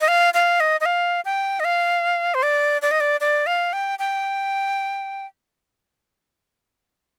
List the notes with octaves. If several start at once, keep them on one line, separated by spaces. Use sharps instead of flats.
D#5
F5
F5
D#5
D#5
F5
G5
D#5
F5
C5
D5
D5
D#5
D5
D5
F5
G5
G5